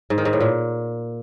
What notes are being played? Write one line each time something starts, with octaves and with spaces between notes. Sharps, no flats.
G#2
D#3
G#2
A2
A#2